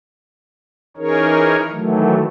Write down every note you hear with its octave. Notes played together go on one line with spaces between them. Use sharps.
E3 C#4 D#4 G#4 A#4 C#5
D#3 E3 F#3 A3